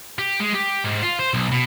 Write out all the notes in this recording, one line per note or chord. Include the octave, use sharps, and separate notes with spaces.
G4
G#3
G4
G#2
F4
C5
B1
B2